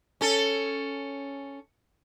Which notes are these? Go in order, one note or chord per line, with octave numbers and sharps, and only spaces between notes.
C#4 A4